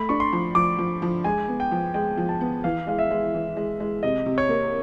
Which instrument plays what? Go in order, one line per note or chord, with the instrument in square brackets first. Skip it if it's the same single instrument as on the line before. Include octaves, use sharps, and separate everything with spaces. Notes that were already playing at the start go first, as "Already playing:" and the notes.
Already playing: [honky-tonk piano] A3 [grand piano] B5
[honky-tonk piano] D4 [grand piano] C#6
[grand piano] C6
[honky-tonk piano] F3
[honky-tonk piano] F3 [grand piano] D6
[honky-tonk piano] F3
F3
[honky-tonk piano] G#3 [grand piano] G#5
[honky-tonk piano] B3
[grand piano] G5
[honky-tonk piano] F3
[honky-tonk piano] G#3 [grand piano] G5
[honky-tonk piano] F3
[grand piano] A5
[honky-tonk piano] B3
[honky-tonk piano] E3 [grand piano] F5
[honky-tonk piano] G#3 [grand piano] F5
[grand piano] E5
[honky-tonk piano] G#3
E3
G#3
G#3
[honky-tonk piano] C3 [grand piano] D#5
[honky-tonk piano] C3
[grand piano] C#5
[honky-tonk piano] A#3